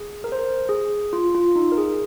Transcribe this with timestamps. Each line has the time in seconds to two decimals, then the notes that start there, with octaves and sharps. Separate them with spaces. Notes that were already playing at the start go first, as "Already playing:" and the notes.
Already playing: G#4
0.24 A#4
0.32 C5
0.39 A#4
0.69 G#4
1.13 F4
1.35 F4
1.56 D#4
1.72 A#4
1.78 G#4